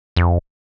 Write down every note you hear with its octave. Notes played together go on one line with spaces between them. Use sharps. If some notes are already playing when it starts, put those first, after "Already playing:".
F2